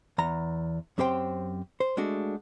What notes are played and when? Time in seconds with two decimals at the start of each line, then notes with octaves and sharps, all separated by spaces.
0.18 E2 A#5
0.98 F#2 C4 G4 C5 G5
1.80 C5
1.97 G#3 A3 D4 F#4